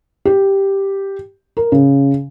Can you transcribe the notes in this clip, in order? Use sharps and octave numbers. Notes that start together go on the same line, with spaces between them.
G4
A#4
C#3